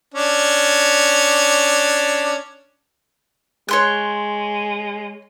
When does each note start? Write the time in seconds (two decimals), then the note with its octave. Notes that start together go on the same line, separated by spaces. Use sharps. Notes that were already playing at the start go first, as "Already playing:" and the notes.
0.14 C#4 D4
3.69 G#3 C#5 C6 F#6